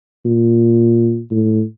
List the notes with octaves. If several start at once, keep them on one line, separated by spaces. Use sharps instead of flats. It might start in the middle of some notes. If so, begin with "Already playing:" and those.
A#2
A2